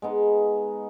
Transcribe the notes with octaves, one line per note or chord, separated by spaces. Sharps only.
G#3 B3 D#4